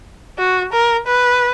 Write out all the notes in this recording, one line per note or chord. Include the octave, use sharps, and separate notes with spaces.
F#4
A#4
B4